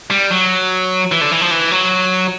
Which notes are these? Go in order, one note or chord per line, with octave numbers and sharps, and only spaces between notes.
G3
F#3
E3
D3
E3
F3
E3
F#3